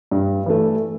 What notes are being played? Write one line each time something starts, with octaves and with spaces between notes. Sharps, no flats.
G2
E3 A3